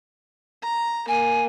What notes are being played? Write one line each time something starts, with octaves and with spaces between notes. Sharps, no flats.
A#5
A#3 G#5